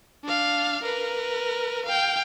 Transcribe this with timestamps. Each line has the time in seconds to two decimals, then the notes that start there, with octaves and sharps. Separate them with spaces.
0.24 D4 F5
0.83 A#4 B4
1.86 F5 G5